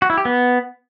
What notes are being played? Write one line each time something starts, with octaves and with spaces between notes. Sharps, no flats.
F#4
E4
G4
B3